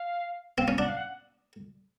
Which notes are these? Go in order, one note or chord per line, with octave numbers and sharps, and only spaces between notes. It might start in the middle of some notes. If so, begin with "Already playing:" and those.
Already playing: F5
C4 F5
C#4
D4 F#5
F5
F#5